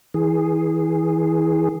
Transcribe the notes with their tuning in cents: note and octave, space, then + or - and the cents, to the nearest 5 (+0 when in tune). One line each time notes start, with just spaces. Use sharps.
E3 -25 G#4 -5